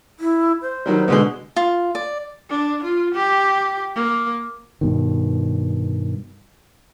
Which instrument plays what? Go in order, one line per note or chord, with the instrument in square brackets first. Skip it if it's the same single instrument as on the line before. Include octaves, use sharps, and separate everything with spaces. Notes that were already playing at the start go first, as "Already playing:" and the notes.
[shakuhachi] E4
C5
[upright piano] D#3 F#3 G3
B2 D3 G#3
[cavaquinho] F4
D5
[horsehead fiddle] D4
F4
G4
A#3
[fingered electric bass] G2 B2 D#3